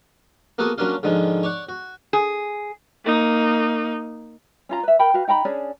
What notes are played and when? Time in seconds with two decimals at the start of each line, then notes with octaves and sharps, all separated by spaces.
0.58 A#3 B3 F#4 G#4 A4
0.78 F#3 A#3 C#4 D4 F4
1.03 G#2 D3 D#3 F3
1.43 C#5 D5 F#5
1.69 F#4
2.13 G#4
3.05 A#3 D#4
4.69 C#4 F4 A#5
4.83 B4 E5
4.99 A#4 G5 B5
5.14 F#4 B4 F5
5.28 D#4 G5 A#5 B5
5.45 C#4 D4 G#4